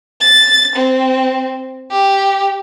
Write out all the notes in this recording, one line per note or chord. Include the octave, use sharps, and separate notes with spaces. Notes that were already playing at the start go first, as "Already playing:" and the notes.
A6
C4
G4